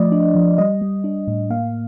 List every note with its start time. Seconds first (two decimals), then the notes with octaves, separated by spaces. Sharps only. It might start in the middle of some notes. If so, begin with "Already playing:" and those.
Already playing: F3 A3 D5 D#5
0.12 D4
0.35 F3
0.58 G3 D#5
0.81 G3
1.04 D4
1.28 A2
1.50 A#3 F5